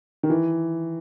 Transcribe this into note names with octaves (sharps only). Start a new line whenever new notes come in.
D#3
E3